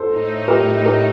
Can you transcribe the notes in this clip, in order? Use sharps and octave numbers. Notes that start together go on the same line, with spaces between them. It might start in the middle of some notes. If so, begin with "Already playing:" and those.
Already playing: A4 C5
A2 A3 D#4
G4 A#4
G4 A#4